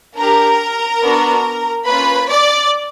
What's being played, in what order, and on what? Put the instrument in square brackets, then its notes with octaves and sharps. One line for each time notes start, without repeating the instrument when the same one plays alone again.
[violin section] D4 G4 A#4 A#5
B3 D4 F#4
A#3 C#4 F4 B4 B5
D5 D6